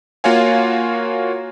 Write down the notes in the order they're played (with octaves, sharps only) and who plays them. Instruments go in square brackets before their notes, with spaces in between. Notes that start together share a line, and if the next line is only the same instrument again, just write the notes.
[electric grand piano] A#3 F4 F#4 C#5 F5 G#5